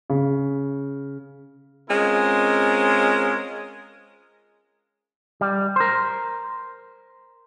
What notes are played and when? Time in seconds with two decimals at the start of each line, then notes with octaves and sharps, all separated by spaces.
0.10 C#3
1.89 G#3 C4 C#4 F4 A#4
5.41 G3
5.76 A#4 C5